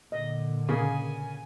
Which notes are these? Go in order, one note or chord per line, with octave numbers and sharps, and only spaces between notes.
A#2 D3 D#5
C#3 A#3 G#4 G#5